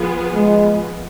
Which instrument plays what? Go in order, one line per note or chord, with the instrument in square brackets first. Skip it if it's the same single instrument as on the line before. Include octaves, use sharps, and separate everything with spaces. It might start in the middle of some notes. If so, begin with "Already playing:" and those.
Already playing: [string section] F3 B3 F4 G#4
[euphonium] G#3